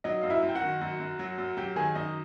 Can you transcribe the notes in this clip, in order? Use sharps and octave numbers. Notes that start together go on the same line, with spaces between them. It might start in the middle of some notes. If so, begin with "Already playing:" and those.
F#3 D#4 D#5
F#2 F5
E4 E5
F#2
G5
F#4 F#5
D#3
F#2
F#2
F#3
F#2
F#3 G4 G5
D#3 G#4 G#5
F#2 D#4 D#5